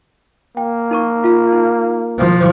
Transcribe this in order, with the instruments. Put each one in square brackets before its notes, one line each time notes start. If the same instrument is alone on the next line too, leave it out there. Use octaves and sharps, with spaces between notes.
[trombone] A#3 [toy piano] G5
[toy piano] D#4 A#4 C#6
F4 F5
D#4
[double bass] F3